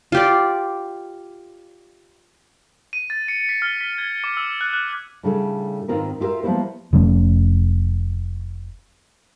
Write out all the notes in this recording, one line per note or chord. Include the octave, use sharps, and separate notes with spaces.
F4 G4 D5
D#7
A6
C#7
B6
F6
B6
G#6
D6
E6
F#6
F#6
A2 C#3 G3 D4 G#4 A4
G#2 D#3 C4 F4 A#4 B4
E4 F4 G4 A#4 E5
F3 G3 A#3 B3 E4 C5
F1 F3 A3 C#4